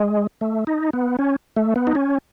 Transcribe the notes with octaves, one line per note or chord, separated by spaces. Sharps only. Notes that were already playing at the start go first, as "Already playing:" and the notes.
Already playing: G#3
A3
D#4
B3
C#4
A3
B3
D#4
C#4